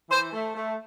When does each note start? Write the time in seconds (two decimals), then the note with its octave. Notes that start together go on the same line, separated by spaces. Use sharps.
0.10 E3 C5
0.33 A3
0.56 A3